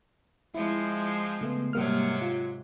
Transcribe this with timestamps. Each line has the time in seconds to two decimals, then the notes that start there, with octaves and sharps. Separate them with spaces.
0.55 F3 G#3 C4 E4
1.41 C#3 A3 B3
1.73 G#2 C3 F#3 G3 A#3 F6
2.22 F4